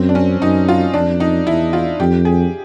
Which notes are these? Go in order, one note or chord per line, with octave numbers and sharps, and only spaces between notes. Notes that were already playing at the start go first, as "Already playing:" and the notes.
Already playing: F#2 C4
D4
C#4
F#2 D#4
F4
F2 D4
D#4
E2 E4
F4
F2 G4
G#4